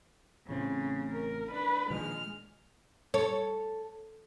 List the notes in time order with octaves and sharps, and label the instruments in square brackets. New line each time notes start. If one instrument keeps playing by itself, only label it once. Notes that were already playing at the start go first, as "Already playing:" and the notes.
[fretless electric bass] A1 A2 C4 [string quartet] C#3
[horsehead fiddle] A#4
[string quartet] D4 [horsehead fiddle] B4
[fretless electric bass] A#2 D#3 F3 [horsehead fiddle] G#3 [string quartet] F6
[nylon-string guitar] A4 [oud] C#5